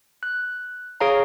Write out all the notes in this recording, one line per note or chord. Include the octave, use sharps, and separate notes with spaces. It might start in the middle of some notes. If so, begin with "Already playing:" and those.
F#6
G#4 C#5 F5 A#5